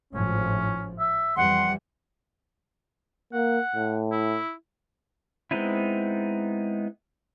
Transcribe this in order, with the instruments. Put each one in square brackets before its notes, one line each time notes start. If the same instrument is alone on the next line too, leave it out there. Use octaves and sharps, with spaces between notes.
[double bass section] G#1 A2 F3 [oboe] C#4
[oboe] E5
[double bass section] F2 E3 G3 [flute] F#5 [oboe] C6
[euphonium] A#3 [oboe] F#5
[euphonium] A2
[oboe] E4
[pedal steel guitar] G#3 B3 C4 D#4 E4